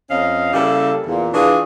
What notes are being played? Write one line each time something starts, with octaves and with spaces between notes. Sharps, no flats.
F2 C#4 D#5 F5
C#3 G3 A#3 E4 A4
E2 A#2
E3 D4 F4 F#4 G#4